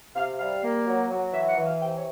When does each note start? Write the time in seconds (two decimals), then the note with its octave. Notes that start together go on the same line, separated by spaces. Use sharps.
0.16 C3 F5
0.39 G3 F5
0.62 A#3
0.86 F#3
1.10 F#3
1.33 E3 E5
1.49 F#5
1.57 E3
1.65 F5
1.80 C3 G5
1.96 C#5